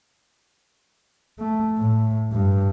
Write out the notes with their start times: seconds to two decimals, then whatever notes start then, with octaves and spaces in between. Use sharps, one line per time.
1.40 A3
1.78 A2
2.33 G2